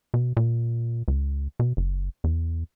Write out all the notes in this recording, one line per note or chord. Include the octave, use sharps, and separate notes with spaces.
B2
A#2
C#2
B2
F#1
E2